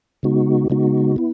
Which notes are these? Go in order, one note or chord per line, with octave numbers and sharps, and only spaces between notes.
C#3 G#3 B3 D#4 F#4
C#3 G#3 B3 D#4 F#4
B3 E4